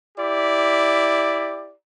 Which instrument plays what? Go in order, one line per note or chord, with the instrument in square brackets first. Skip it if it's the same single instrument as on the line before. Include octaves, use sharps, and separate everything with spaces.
[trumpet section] E4 G4 D5